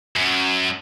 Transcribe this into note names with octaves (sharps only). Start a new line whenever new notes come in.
F#2